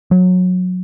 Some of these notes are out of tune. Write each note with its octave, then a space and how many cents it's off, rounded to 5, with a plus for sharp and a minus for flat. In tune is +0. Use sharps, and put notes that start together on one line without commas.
F#3 -20